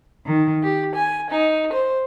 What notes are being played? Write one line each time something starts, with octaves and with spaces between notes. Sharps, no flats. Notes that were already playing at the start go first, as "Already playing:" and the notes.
D#3
G4
G#5
D#4
C5